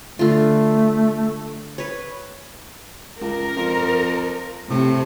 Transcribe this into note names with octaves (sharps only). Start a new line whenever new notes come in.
D3 A3 F4
B4 C#5
C#2 A#4
F2
A2 C3